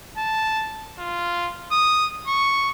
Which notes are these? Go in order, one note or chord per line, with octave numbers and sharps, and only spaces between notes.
A5
F4
D#6
C#6